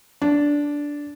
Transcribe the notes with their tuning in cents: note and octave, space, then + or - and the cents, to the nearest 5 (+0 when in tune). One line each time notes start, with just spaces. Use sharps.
D4 -10